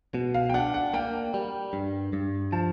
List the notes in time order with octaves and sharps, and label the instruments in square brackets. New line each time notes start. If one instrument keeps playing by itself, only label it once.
[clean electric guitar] B2
[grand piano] F5
G5
[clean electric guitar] D4 [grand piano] F#5
[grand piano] F#5
[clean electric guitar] A#3 [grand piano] G5
[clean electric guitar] G3
G2
G2
[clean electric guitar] F3 [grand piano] A5